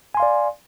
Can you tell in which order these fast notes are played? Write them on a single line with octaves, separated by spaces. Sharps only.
G#5 C6 F5 D5